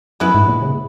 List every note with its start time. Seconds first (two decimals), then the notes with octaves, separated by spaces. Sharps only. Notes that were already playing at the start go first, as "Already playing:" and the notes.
0.20 F#2 G#3 B3 E4 B4
0.34 G#2
0.48 A#2
0.62 C#3